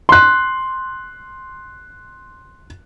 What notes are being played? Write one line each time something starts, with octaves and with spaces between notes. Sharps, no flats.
C6 F#6